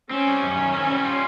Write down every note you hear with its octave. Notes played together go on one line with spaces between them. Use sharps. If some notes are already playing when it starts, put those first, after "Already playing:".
C4 C#4
G3
F#2
D#3
C4
G3
F4